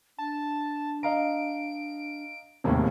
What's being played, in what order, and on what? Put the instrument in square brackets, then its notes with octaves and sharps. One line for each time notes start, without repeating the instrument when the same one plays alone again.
[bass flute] D4 [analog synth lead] A5
[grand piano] D#5 F5 A#5 [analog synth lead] D7
[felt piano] E1 A2 [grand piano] D#2 C3 [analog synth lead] A#3